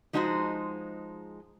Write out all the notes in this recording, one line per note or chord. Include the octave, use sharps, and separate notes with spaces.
F3 G#3 D#4 F#4 G#4 C5